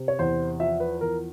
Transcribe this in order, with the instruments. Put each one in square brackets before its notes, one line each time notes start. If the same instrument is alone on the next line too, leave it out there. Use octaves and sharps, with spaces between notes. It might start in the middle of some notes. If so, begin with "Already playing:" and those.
Already playing: [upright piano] C3
C#5
E2 C5
F3 E5
B4
E2 A#4